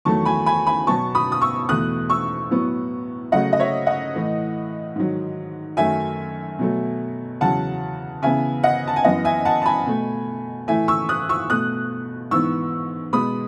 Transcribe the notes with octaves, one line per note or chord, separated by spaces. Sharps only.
E2 D#3 F#3 A3 A5 C#6
G#5 B5
G#5 B5
G#5 B5
B2 F#3 B3 A5 C#6
B5 D#6
D#6
C#6 E6
E2 B2 A3 D#6 F#6
C#6 E6
A2 F#3 B3
C#3 F#3 A3 D#5 F#5
D#5
C#5 E5
D#5 F#5
A2 E3 A3
G#2 D#3 F#3
F#2 D#3 F#3 A3 E5 G#5
B2 F#3 A3
E2 C#3 F#3 F#5 A5
C#3 E3 B3 E5 G#5
D#5 F#5
A5
G#5
F#2 E3 B3 D#5 F#5
E5 G#5
F#5 A5
A5
G#5 B5
B2 A3
A2 E3 A3 E5 G#5
C#6 E6
D#6 F#6
C#6 E6
B2 A3 D#6 F#6
G#2 E3 B3 C#6 E6
B2 G#3 B3 B5 D#6